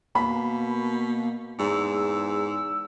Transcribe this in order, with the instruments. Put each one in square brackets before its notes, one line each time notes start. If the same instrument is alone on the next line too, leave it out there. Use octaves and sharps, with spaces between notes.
[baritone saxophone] B2 [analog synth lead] A#3 [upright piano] B5
[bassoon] E2 [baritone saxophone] G#2 [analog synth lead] E6